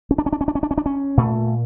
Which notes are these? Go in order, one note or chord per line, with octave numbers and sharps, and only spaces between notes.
C#4
D4
C#4
D4
C#4
D4
C#4
D4
C#4
D4
C#4
A#2 A3